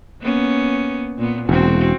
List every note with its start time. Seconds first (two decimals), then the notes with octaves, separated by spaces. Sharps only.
0.21 A#3 B3 C#4
1.18 A#2 B3
1.49 E1 C4 F#4